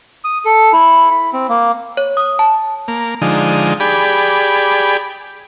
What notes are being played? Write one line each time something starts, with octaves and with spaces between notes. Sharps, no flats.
D#6
A4
E4
B5
C4
A#3
C#5
D#6
A5
A#3
D3 F3 G#3 D#4
G4 G#4 D5 B5